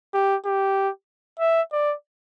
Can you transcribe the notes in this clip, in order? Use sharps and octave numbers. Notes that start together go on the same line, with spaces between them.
G4
G4
E5
D5